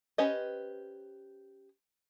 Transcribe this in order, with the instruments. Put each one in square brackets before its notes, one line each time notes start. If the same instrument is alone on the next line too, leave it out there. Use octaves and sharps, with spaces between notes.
[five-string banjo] C#4 G4 B4 C5 D#5